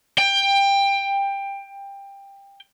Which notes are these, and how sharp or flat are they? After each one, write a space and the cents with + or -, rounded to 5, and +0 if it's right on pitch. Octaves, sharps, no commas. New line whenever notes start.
G5 +20